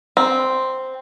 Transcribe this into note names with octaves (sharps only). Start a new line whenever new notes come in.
C4